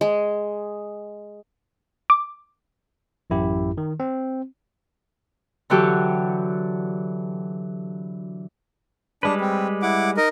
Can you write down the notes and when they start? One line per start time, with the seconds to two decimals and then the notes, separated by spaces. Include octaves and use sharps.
0.01 G#3
2.10 D6
3.30 A1 F#2 E4 G4
3.78 D#3
4.00 C4
5.70 D3 E3 F#3 F#4 G4 A4
9.23 G3 G#3 D4 B4
9.41 C4
9.82 E4 F#5 D6
10.17 D#4 A#4 D#5